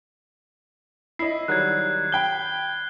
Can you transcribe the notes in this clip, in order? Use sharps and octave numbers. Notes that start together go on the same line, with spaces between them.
E4 D#5 C7
D#3 F#3 G3 F#6 G#6
G5 B5 G6 G7